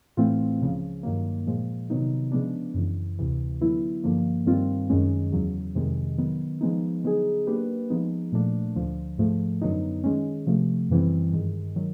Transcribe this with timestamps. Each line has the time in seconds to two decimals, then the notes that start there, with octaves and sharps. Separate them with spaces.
0.17 A2 E3 A3 C4 F4
0.60 C#2 C#3 F3
1.03 G2 D#3 F#3 A#3
1.46 A#2 F3 G#3
1.90 C3 D#3 F#3 B3 D#4
2.32 C#3 F3 G#3 B3 D4
2.75 F#2 C#3 E3
3.19 D2 C3 E3
3.61 D3 F#3 B3 E4
4.04 G2 D3 F3 A#3
4.46 G2 D#3 G3 C4 F4
4.89 F#2 D#3 G#3 C#4
5.32 E2 C#3 F#3
5.75 F2 C3 D#3 G#3
6.18 D#3 F#3 B3
6.61 F3 G#3 B3 D#4
7.04 D3 F#3 B3 D#4 G#4
7.47 F#3 A#3 D4 G4 B4
7.90 F3 G#3 B3 D#4
8.32 A#2 F3 A3 D4
8.76 D2 D3 F3
9.18 G#2 F3 A3
9.61 F#2 D3 F#3 B3 D#4
10.04 D#3 G#3 C#4
10.47 C3 F3 A3
10.90 F#2 C#3 E3 G3 C4
11.33 G2 D#3 G#3
11.76 D#3 F#3